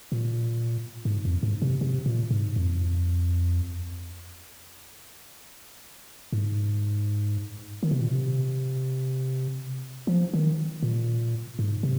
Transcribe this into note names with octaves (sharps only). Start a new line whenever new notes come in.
A#2
G#2
F2
G#2
C3
C3
A#2
G#2
F2
G#2
D#3
C3
A#2
C3
F3
D#3
A#2
G#2
C3